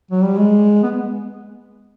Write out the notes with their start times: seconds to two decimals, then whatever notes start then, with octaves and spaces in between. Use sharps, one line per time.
0.11 F#3
0.23 G3
0.37 G#3
0.83 B3